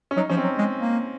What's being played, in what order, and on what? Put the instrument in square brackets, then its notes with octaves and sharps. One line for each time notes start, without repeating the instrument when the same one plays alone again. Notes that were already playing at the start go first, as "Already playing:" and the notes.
[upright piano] C#4
[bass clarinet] F#3 [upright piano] D#4
[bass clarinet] F3 [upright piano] C#4
[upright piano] C4
[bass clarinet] F#3
G#3
A#3